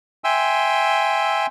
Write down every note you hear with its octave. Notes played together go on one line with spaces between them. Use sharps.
E5 G5 G#5 C6 E6